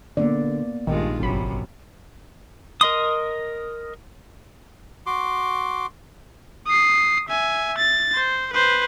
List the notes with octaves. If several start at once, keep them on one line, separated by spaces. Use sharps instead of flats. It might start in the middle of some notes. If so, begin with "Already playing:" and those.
D3 A#3 B3 D5
A#1 G2 D#3 G#3 F4
G1 F#2 C3 B5
A#4 D#5 C6 D#6
F#4 C6 D6
D#6 C7
E5 G#5
A6
C5
B4 C5